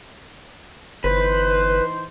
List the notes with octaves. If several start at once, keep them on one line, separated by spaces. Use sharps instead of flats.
G1 E3 D#4 B4 C5